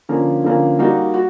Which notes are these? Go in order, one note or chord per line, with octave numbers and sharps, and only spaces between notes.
D3 F3 A#3 C#4
D3 F3 A#3 C#4
G3 A#3 D#4 F#4
F#4